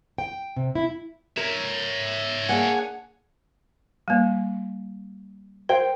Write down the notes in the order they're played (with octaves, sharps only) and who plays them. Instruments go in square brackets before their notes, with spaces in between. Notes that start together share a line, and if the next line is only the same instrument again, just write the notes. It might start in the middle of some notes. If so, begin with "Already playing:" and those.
[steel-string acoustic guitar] G5
C3
E4
[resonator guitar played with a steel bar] A#4 [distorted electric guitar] C#5 E5
[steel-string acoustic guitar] A#3 D4 G#4 [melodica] F#5 G#5
[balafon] G3 A#3
[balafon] A#4 [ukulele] C5 G5